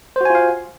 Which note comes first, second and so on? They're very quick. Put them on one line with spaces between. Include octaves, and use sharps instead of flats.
C5 F#4 G#5 F4 F5